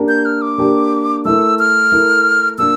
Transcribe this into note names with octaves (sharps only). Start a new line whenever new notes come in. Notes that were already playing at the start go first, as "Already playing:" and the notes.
Already playing: A#3 D4 G4 A#4
G6
F6
D6
A#3 D4 G4 A#4
A3 E4 A#4 E6
F6
A3 E4 A#4
A#3 D4 F4 A#4 E6